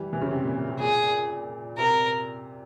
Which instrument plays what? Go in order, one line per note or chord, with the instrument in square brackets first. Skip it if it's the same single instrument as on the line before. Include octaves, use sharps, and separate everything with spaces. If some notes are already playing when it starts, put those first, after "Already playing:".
Already playing: [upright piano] E3 G3
E3
C#3
C3
A#2
A#2
C3
[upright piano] A#2 [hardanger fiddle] G#4
[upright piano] C3 [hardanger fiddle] A#4